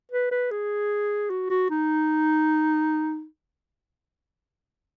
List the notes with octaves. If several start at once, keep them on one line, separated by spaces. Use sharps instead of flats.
B4
B4
G#4
F#4
F#4
D#4